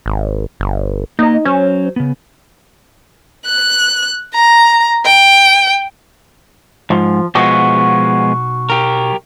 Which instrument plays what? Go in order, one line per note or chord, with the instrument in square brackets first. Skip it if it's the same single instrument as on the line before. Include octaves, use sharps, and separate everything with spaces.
[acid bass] G#1
G1
[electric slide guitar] A#3 D#5 [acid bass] D#4
[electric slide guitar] F#3 C5 [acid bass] C#4
[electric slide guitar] C#3 B3
[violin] F#6
A#5
G5
[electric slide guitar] G#2 [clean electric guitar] F3
[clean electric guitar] B1 F#4 [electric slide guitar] F3 G#3 B3
[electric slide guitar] G4 A#4